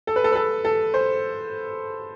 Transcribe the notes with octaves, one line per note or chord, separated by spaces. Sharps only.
A4
B4
A4
B4
A4
A4
C5